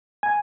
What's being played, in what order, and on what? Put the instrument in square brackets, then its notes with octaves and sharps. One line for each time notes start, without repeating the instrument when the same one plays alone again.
[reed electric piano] G#5